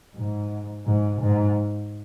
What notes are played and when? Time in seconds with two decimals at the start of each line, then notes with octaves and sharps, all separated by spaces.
0.15 G#2
0.86 G#2
1.21 G#2